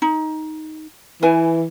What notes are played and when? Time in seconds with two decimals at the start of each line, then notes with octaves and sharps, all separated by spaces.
0.02 D#4
1.23 E3 B4 G#5